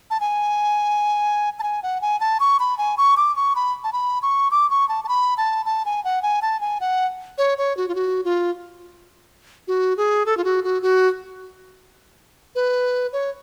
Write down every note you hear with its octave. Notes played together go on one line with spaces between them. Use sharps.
A5
G#5
A5
G#5
F#5
G#5
A5
C#6
B5
G#5
C#6
D6
C#6
B5
A5
B5
C#6
D6
C#6
A5
A5
B5
A5
A5
G#5
F#5
G#5
A5
G#5
F#5
C#5
C#5
F#4
F4
F#4
F4
F#4
G#4
A4
F4
F#4
F#4
F#4
B4
C#5